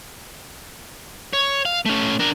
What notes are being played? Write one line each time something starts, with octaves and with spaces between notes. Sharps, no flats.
C#5
F5
A3 C#4
D4 A#4